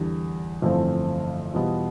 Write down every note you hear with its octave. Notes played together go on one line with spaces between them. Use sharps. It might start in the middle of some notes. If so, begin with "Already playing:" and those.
Already playing: E2 D3 G3
G1 F2 E3 A3 C4
E2 B2 G3 B3 F4